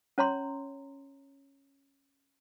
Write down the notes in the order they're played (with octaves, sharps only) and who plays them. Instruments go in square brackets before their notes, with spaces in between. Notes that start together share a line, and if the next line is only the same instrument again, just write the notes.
[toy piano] C#4 C#5 A#5 C6